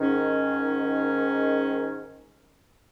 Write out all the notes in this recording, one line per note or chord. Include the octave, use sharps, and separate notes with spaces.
G#2 D#3 C#4